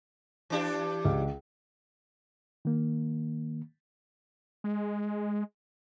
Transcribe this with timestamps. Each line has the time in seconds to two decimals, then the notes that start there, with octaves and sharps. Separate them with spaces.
0.50 E3 D4 G4
1.05 C#2
2.65 D#3 A#3
4.64 G#3